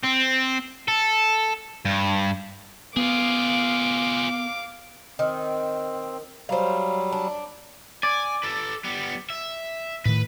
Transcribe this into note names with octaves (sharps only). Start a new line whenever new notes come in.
C4
A4
G2
B3 F4 G#4 F5 D6
D#3 C4
F#3 G3 C5 F5
D4
D5 G#5
A4 B4
G3 B3
E5
A2 D#3 B4